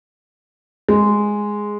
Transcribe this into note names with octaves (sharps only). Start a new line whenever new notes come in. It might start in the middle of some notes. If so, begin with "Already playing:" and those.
G#3